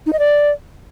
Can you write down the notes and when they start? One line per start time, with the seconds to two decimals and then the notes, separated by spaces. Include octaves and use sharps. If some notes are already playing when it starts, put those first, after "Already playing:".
0.06 D#4
0.13 D#5
0.19 D5